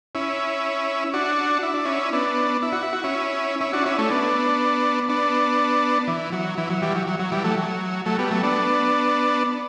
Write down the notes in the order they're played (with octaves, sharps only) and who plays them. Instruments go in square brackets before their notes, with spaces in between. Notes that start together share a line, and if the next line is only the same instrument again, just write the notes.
[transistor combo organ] C#4 E4
D4 F#4
E4
D4
C#4 E4
B3 D4
E4
F#4
E4
F#4
C#4 E4
C#4 E4
D4 F#4
C#4 E4
A3 C#4
B3 D4
B3 D4
E3
F#3
E3
F#3
E3 G3
F#3
F#3
F#3
E3 G3
F#3 A3
F#3
F#3 A3
G3 B3
F#3 A3
B3 D4